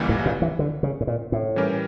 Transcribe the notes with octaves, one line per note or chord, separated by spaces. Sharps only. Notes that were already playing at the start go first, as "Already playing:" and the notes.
Already playing: C#2 C#3 E3 G3 A#3
A2
A#2
E3
D3
C#3
A2
A#2
A2
E3 G3 C#4 G4 A#4